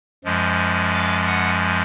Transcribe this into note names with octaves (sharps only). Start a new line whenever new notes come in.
F#2 F3 G#3
F5
F#5